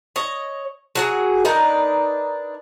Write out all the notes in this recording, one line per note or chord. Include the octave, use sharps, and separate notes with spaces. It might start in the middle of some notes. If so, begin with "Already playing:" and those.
C#5 D#5
F#3 F#4 G#4
D4 D#4 A#4 B4